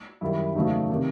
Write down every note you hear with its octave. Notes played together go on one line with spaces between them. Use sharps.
F#2 D#3 G3 E4
E2 C#3 F#3 A3 D#4
C3 D#3